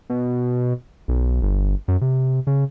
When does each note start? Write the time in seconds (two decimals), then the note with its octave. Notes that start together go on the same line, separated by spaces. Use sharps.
0.10 B2
1.08 B1
1.42 G1
1.88 F#2
2.02 C3
2.47 C#3